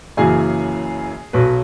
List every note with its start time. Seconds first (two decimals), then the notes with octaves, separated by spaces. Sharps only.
0.17 F#1 F#2 C#3 E3 G#4 G#5
1.33 B1 B2 F#3 B4